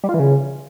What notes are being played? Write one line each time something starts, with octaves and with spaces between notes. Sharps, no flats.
G3
F4
E3
C#3